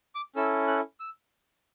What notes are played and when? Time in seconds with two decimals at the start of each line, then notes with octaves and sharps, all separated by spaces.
0.15 D6
0.36 C#4 E4 A4 E6
0.68 F#6
1.00 E6